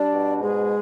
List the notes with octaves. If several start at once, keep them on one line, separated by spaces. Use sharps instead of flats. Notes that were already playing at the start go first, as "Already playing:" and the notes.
Already playing: G3 D4 D5
B2
G#2 G#3 G#4